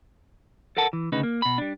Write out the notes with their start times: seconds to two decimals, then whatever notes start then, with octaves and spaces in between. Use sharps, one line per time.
0.77 A4 A#4 F#5 A5
0.93 E3
1.12 D2 C#3 D#4 B4
1.23 A#3
1.42 B2 B5
1.58 G3 D4